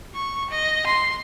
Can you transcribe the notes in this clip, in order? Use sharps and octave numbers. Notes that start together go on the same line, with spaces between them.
C#6
D#5
C6